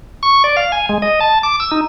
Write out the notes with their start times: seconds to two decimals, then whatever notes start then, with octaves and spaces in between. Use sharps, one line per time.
0.23 C#6
0.44 D5
0.57 F5
0.72 G#5
0.89 G#3
1.02 D#5
1.21 A5
1.43 D6
1.60 E6
1.71 D#4